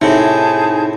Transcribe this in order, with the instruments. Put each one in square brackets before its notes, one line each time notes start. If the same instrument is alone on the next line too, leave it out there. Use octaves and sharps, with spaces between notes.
[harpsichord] A2 C3 [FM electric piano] D#4 [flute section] G#4 A5 G6